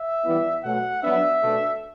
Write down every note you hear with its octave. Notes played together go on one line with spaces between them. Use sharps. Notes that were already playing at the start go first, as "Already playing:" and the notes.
Already playing: E5
E3 G3 B3 E4
B2 F#3 A3 F#5
F#3 B3 D4 E5
B2 A3 D4